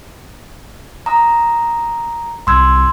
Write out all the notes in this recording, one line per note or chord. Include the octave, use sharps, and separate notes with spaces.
A#5 D#6
C2 C6 E6 G#6